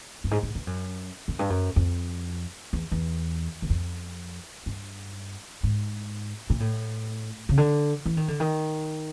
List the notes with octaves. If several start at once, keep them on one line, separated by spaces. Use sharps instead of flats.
G2
G#2
G#2
G2
F#2
F#2
G2
F#2
F2
E2
E2
E2
F2
G2
G#2
A#2
A2
C#3
D3
E3
D#3
D3
D#3